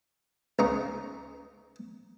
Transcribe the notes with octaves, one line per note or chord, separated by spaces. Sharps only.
C#2 D#4 A#5 C#6